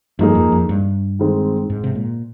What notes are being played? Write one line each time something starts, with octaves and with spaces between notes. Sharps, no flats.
G2 F3 A#3 D#4 G#4
F2
F2
G2
D#3 G#3 C4
G#2
C3
A#2